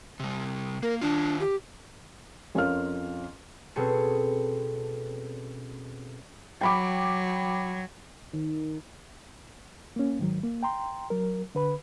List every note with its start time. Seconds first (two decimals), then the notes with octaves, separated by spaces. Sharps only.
0.20 C3 G3
0.83 A#3 A#4
1.02 D#3 D4 F4
1.40 G4
2.55 F2 C#4 F4 A#4 F5 F6
3.76 B2 C4 C#4 G#4 A4 C#7
6.61 F#3 G5 B5 D6
8.33 D#3
9.96 A#3 C#4
10.19 G#2 D#3 F#3
10.43 A#3
10.63 G5 A#5 C6
11.10 F#3 A#4
11.55 D3 B4 B5